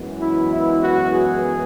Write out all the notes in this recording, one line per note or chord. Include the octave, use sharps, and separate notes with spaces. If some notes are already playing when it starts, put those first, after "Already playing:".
Already playing: F#2 E3 G#3 B3
E4
E4
F#4
G#4